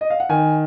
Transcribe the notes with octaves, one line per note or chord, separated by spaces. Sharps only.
D#5
F5
F#5
D#3 G#5